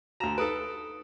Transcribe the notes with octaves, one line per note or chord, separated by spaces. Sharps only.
D2 F#4 A5 A#5 E7
D#4 A4 B4 D#6 D7